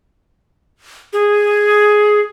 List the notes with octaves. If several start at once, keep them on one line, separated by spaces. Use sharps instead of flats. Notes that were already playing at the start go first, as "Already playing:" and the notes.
G#4